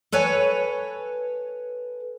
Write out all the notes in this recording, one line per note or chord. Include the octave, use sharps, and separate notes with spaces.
A4 B4 C#5 G#5